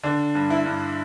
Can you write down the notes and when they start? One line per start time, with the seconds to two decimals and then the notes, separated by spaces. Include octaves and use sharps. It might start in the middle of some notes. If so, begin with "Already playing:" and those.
0.03 D3 D4
0.35 G2
0.50 E4
0.66 G2